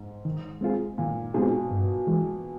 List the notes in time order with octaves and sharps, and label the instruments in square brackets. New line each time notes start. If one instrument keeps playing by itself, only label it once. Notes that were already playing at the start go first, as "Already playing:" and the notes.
Already playing: [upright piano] G#2
[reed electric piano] D#3
G#3 C4 F4 G#4
[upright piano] A#2 [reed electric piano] D#3
[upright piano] B2 [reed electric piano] G#3 C4 F4 G#4
[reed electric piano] G2
E3 G#3